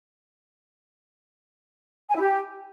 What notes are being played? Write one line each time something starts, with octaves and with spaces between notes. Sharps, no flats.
G#5
E4
G4